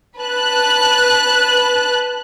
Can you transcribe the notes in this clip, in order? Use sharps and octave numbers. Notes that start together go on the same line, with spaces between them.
B4 A5 F#6